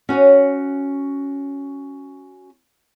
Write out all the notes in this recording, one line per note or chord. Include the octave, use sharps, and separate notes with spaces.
C#4 F#4 C#5 G#5